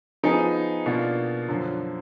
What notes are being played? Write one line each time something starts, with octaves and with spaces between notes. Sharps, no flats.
F3 B3 D#4 G#4
B2 A#3 D4 F4
F#2 D3 F3